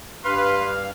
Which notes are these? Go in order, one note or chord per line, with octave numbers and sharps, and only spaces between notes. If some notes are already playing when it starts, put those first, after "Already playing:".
G2 B4 F5 C6